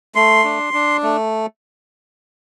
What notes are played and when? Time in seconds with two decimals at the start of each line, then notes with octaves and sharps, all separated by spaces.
0.15 A3 C6
0.44 D4
0.73 D4
1.03 A3